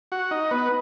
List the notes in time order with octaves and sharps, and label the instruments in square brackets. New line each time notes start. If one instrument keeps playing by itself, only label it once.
[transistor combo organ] F#4 F#5
D#4 D#5
B3 B4